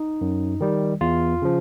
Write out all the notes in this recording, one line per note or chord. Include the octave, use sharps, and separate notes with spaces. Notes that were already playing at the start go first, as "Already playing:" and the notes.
Already playing: D#4
F#2
D#3 G3
E2 F4
C#3 F3